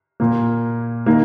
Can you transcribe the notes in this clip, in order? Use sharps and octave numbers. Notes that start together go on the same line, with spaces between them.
A#2 A#3
D#3 A#3